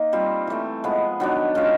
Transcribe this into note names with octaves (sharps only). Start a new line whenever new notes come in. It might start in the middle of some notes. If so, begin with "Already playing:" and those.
Already playing: A#3 D#4
G3 C4 F4
E3 A3 C4
F3 G#3 B3
D#3 F#3 B3 D4
D#3 G#3 C#4 F4